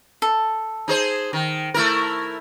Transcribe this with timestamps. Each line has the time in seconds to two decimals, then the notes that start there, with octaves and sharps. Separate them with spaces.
0.22 A4
0.88 D#4 G#4 C5
1.33 D#3
1.74 A3 E4 A#4